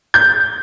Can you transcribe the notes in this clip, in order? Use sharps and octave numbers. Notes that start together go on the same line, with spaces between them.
G6